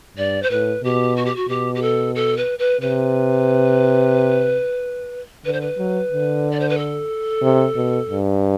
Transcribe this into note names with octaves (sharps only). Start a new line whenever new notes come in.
G2 D5
C5
A2 B4
B2 G4
F#4
G4
F#4
B2 G4
G4
A4
A4
B4
B4
C3 B4
D3 B4
C5
B4
F#3
D3
D5
C5
B4
A4
C3
B2
G2